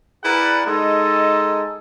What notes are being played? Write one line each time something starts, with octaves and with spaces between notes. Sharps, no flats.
E4 G#4 A#4 B4 D5 F#5
G#3 D#4 A4